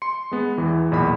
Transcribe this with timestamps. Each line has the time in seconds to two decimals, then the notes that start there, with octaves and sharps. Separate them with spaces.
0.02 C6 C#7
0.31 G#3 B3
0.58 E2 E3
0.91 B1 E2 A#2 D#5 B5